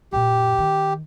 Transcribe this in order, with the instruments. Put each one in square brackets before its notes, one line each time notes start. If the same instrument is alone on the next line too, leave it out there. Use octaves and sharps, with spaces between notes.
[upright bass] F#2 A#2 [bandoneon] G4
[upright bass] D#3